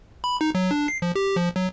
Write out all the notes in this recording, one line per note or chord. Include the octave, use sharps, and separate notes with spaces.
B5
D#4
F#3
D4
C7
F3
G4
F3
F#3